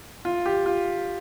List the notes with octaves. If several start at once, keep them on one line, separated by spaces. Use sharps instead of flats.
F4
G4
F4